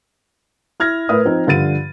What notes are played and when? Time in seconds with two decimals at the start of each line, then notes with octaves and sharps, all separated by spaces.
0.80 E4 F6 G#6 A#6
1.09 A2 A#4 B4 E5 D#6
1.25 F3 C4 D#4
1.47 G2 D3 F3 A6 D#7